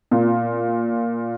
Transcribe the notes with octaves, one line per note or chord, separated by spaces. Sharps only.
A#2